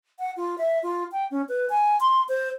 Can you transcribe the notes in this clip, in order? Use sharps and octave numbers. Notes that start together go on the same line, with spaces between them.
F#5
F4
E5
F4
G5
C#4
B4
G#5
C6
C5